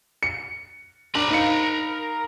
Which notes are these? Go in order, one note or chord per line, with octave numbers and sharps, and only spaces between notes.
C#7
D4 A#4 B5
D#4 F5 C#7